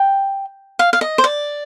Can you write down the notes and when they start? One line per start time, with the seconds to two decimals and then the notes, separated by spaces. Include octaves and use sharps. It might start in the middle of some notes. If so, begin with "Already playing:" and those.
Already playing: G5
0.79 F5
0.93 F5
1.01 D#5
1.18 C5
1.24 D5